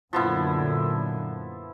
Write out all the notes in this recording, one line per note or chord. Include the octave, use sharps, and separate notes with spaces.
F#2 A#2 D3 F3 B3 E4